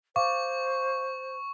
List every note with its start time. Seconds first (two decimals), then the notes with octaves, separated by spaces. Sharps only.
0.16 C5 F5 C#6 D6